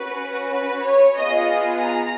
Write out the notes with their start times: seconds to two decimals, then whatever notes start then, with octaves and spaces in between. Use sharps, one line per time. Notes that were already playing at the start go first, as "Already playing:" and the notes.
Already playing: C#4 F#4 B4
0.52 B4
0.84 C#5
1.17 B3 F4 G#4 D#5
1.79 A#5